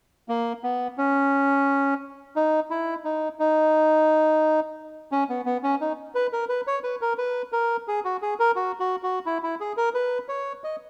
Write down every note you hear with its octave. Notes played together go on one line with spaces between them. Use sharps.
A#3
B3
C#4
D#4
E4
D#4
D#4
C#4
B3
B3
C#4
D#4
B4
A#4
B4
C#5
B4
A#4
B4
A#4
G#4
F#4
G#4
A#4
F#4
F#4
F#4
E4
E4
G#4
A#4
B4
C#5
D#5